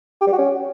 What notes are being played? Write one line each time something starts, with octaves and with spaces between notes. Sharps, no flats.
G4
G3
F#4
C#4